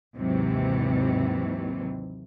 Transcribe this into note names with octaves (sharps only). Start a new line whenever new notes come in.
D#2 G#2 C3 E3 F#3